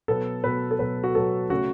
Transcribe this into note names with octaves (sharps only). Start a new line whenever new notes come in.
B2 F#3 B3 A4
B2 F#3 B3 B4
A4
B2 F#3 B3 B4
F#4
B2 F#3 B3 A4
C#3 A3 C#4 F#4